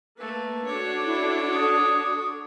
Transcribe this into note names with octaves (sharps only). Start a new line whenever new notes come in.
A3 A#3 B4
D4 F#4 A4 C#5 D6
E4
D#6